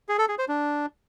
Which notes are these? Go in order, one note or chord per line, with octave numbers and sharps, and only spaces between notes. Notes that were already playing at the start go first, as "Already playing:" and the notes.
G#4
A4
G#4
C5
D4